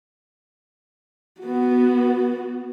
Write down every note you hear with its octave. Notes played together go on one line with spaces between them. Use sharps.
B3 F#4